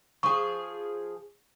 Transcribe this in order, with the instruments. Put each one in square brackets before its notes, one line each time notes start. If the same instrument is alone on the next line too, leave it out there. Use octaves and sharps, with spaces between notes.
[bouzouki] F3 G#4 [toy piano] C#6